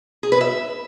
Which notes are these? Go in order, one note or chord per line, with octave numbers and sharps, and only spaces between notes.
G#4
B4
E5